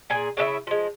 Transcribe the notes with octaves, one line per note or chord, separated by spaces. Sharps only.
A#2 G#4 G#5
C#3 D4 E4 E5
F3 G#3